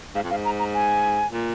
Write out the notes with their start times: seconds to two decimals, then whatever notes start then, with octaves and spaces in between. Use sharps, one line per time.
0.15 G#2 F5
0.23 F2
0.30 G#2 F5
0.45 A#5
0.59 A#5
0.74 G#5
1.32 A#2